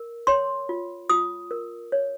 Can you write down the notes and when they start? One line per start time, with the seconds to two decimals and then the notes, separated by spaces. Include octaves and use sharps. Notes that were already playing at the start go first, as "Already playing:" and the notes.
Already playing: A#4
0.27 C#5 C6
0.69 F4
1.10 F4 D#6
1.51 A#4
1.92 C#5